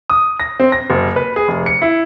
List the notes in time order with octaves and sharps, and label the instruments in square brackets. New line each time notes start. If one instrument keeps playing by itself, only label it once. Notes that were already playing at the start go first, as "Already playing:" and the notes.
[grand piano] D#6
A#6
C4
A#6
F#1
B4
G#4
F1
C#7
E4